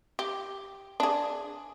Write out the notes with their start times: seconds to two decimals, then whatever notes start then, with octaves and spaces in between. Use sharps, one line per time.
0.19 G4
1.00 D4 G#4